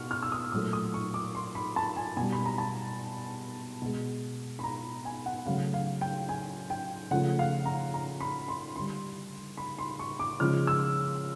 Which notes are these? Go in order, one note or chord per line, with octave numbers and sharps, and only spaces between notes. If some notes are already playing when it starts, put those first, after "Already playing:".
Already playing: B2 C#6 F6
F6
E6
D#6
A#2 F#3 A3 D#6
D#6
C#6
D6
C6
B5
A5
G#5
B2 G3 G#5
B5
A#5
A5
B2 G#3
B5
A#5
G#5
F#5
C#3 F#3 A3 F5
F5
G5
G#5
G5
C#3 F3 A3 F#5
F5
A#5
A#5
B5
C6
D3 G3 C6
B5
C6
C#6
D6
C#3 F3 G#3 F6
E6